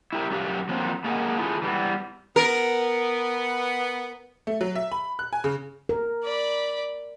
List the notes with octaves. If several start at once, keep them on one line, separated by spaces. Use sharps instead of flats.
E4 G4 A#4
F#2 F#3 G4 E5 F5
F3 F#3 A#3 C4 F4 C5
A3 A#3 G#4 A#4 D#5 F#5
A3 E4 F4 G#4
E3 G3 A#3 B3
B3 A#4
A3
F#3
E5
B5
F#6
G#5
C#3
A#4
D5 B5